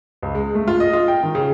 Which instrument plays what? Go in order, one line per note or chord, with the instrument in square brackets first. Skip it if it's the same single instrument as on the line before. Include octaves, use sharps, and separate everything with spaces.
[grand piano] C#2
G#3
A3
F4
D#5
F4
G5
D#3
C#3